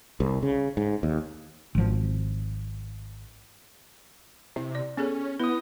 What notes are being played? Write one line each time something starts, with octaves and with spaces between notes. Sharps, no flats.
C2
C#3
G#2
D#2
G#1 F3
C3 E4
D5
B3 C#4 G#4 A4
B3 E4 B4 D#6